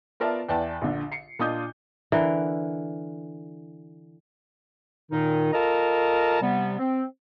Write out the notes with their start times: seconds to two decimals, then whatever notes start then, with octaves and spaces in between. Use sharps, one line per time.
0.20 B3 F4 A#4 D5 E5 A5
0.49 E2 B4 D5 E5 G5 A5
0.82 A#1 D3
1.12 C7 C#7
1.39 A#2 D4 F4 D#5 D#6 G6
2.12 D3 E3 A#4
5.11 A#2 D#3 D#4
5.53 F4 A4 A#4 D#5 A5 A#5
6.41 C3 G3 B3
6.79 C4